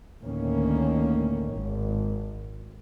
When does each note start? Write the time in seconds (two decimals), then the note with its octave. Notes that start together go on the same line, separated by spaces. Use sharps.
0.22 D2 A2 D#3 A#3 C#4
1.56 G#1